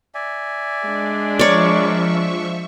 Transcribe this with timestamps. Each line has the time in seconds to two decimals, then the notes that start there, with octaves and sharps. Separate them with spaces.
0.15 D5 E5 G#5
0.87 G#3 D4
1.39 F3 A#4 C#5 D5 E5 C#6